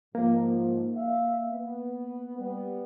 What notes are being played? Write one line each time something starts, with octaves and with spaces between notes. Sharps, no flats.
G#2 F3 A#3
E5 F5
B3
G3 B3